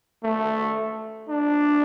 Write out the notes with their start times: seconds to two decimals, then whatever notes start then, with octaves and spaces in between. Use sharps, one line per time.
0.24 A3
1.29 D4